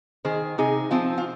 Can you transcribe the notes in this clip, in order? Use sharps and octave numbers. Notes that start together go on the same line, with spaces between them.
D#3 G#4 C5
C3 D#4 G#4
F3 C4 F4
F4